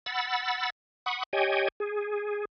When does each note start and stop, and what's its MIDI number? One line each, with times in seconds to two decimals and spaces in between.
0.06 0.70 78
0.06 0.70 83
0.06 0.70 88
0.06 0.70 93
1.06 1.23 78
1.06 1.23 83
1.06 1.23 85
1.06 1.23 87
1.33 1.68 67
1.33 1.68 73
1.33 1.68 75
1.33 1.68 79
1.33 1.68 80
1.80 2.45 68